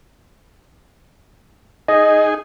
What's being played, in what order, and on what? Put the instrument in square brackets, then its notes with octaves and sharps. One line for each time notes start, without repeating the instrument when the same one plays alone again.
[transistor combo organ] D#4 G#4 [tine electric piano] D#5